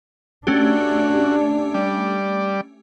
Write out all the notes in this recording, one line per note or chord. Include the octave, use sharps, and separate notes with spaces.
A3 C#4 D4 F#4 G4
G3 D5